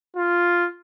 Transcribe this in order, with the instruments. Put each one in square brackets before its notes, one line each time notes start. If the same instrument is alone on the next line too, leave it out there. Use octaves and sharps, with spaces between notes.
[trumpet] F4